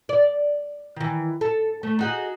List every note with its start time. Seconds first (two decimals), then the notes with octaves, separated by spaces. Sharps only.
0.09 D5
0.96 D#3 E3
1.41 A4
1.83 A3
1.99 D#4 F#4 G#4